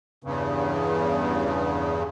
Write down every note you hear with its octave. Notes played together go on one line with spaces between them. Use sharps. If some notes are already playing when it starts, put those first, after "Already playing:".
E2 G2 C#3